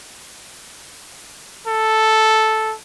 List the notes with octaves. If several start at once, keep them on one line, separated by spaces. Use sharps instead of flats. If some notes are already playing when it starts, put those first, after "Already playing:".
A4